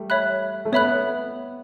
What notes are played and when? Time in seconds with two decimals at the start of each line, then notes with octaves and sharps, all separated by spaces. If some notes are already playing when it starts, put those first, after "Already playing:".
Already playing: G3 A3
0.10 C#5 E5 B5 F#6
0.65 A3
0.72 B3 C#5 E5 B5 F#6